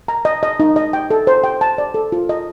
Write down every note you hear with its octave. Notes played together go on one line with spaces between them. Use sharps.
A#5
D#5
D#5
D#4
D#5
G5
A4
C5
G5
A5
D5
A4
F4
D#5